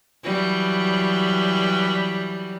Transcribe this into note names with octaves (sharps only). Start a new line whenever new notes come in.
E3 F#3 G3